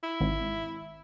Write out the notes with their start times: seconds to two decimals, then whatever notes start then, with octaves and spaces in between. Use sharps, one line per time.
0.03 E4
0.20 G#1